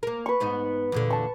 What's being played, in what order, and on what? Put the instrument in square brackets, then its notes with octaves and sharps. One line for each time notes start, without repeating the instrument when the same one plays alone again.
[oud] A#3 A#4
[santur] B4 C#6
[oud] G#2 B3 D#4
E2 A#2 D3
[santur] A5 C#6